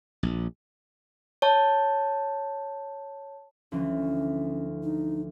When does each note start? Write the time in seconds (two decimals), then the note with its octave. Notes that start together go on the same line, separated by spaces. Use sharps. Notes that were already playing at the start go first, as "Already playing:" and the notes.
0.23 A#1
1.42 C#5 A5
3.72 D2 E3 F3 C#4
4.83 D#4